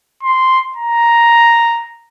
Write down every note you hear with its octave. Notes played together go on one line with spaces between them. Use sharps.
C6
A#5